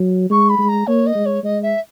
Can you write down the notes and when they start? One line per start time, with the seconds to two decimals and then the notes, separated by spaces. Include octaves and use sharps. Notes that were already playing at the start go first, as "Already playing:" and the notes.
Already playing: F#3
0.30 G#3 C#6
0.49 B5
0.58 G#3
0.68 A#5
0.86 A#3 C#5
1.06 D#5
1.15 G#3
1.25 C#5
1.43 G#3 D#5
1.62 E5